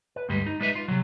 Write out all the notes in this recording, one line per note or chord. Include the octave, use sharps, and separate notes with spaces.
B4
D2 G2 G3 G#3
D#4
G3 G#3 D#4 B4 E5
F4
C3 F#3